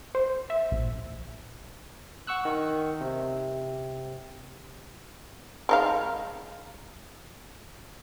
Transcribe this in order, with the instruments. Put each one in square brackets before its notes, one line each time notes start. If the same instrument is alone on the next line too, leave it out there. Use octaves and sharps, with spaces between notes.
[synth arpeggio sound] C5
E5
A#1
[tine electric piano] F#5 C#6 E6 F#6
D#3
C3
[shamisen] G#3 D#4 F5